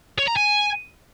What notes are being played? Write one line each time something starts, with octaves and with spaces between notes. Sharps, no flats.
C#5
A#5
G#5